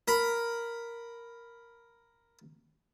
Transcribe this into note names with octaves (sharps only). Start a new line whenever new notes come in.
A#4 B5